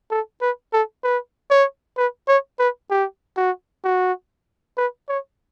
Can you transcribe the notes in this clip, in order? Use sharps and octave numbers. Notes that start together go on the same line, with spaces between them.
A4
B4
A4
B4
C#5
B4
C#5
B4
G4
F#4
F#4
B4
C#5